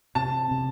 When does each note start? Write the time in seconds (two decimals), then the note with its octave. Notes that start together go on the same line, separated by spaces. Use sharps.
0.15 C3 A5
0.51 C3